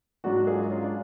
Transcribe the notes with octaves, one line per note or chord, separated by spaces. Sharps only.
G#2 F#3 D4 F#4
F4 G#4
C#4 F4
D4